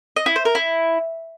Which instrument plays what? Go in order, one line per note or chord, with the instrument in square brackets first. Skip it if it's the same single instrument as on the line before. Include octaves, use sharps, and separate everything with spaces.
[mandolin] D#5
E4
C5
A#4
E4